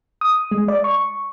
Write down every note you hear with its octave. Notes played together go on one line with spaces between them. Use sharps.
D#6
G#3
D5
C#6